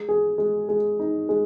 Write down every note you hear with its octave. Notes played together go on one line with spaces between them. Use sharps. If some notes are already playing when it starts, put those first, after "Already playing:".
Already playing: G#3
G#4
G#3
G#3
D#4
G#3